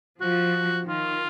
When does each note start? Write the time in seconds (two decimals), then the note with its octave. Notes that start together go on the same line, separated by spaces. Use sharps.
0.21 F3 F#4
0.86 D#3 F4